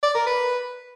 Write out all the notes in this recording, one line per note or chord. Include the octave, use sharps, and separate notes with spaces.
D5
A#4
B4